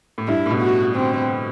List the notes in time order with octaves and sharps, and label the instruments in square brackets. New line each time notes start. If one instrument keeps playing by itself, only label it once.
[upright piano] A2
[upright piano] G2 [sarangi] E4
[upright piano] A2
B2
[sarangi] F#4
[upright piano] D3 [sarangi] C4